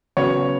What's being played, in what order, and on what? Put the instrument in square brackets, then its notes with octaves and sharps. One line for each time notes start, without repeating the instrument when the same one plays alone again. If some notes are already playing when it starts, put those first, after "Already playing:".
[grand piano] C#3 F#3 B3 [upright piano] C#5